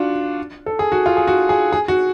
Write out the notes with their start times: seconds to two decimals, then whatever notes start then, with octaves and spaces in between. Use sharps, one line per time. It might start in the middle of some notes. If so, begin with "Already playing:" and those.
Already playing: D4 F4 F#4
0.66 A4
0.79 G#4
0.92 F#4
1.06 F4
1.17 G#4
1.27 F#4
1.49 G#4
1.73 G#4
1.88 F#4